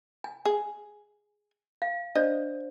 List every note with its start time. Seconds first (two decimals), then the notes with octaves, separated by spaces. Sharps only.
0.24 G#5
0.45 G#4
1.82 F5
2.15 D4 C5 D5 D#5